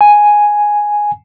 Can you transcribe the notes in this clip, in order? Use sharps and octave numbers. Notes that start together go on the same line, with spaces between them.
G#5